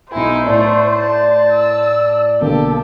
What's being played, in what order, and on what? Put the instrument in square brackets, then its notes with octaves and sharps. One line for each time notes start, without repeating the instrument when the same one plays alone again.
[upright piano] B1 G#5 [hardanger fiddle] D#4 E4 [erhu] C5
[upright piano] A2 [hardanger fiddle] A3 [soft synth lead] D5
[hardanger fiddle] A5
[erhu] E6
[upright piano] B1 D3 A#3 [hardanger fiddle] G4 [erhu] A4